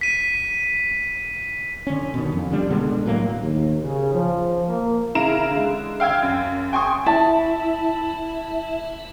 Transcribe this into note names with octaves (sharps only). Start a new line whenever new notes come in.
B6 D#7
D3 C#4
B2 D#3
F2
D3 G3 D4
B2 D3 G#3 B3
A2 F#3 A#3
D#2
C#3
F3
A#3
C#3 E4 F5 A#5 D7 E7
D3 G#3
F5 G5 E6 G#6
F#2
G5 G#5 C6 C#6 D#6
E4 A5